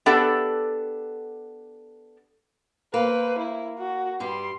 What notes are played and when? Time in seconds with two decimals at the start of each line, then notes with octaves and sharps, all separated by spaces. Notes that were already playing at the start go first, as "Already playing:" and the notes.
0.06 B3 D4 G4 A4 F#5 A5
2.94 A#3 B4 C5
3.39 E4
3.78 F#4
4.20 G2 G3 C6